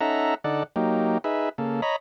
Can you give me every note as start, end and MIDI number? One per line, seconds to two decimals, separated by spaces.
0.01 0.35 61
0.01 0.35 63
0.01 0.35 69
0.01 0.35 76
0.01 0.35 78
0.01 0.35 82
0.44 0.63 50
0.44 0.63 63
0.44 0.63 69
0.44 0.63 74
0.44 0.63 78
0.76 1.18 54
0.76 1.18 58
0.76 1.18 63
0.76 1.18 67
1.24 1.49 63
1.24 1.49 68
1.24 1.49 71
1.24 1.49 76
1.58 1.81 49
1.58 1.81 58
1.58 1.81 69
1.82 1.96 73
1.82 1.96 75
1.82 1.96 82
1.82 1.96 83